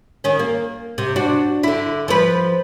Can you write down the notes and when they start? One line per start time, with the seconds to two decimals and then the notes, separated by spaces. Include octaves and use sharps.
0.24 D#3 C#4
0.39 A#3
0.98 C3
1.16 D4 F#4
1.63 D3 E4
2.08 F3 B4